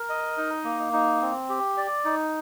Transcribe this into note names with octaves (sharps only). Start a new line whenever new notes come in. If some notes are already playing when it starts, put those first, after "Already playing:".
Already playing: A#4
D#5
D#4
A#3
D#4
C4
G4
D5
D#4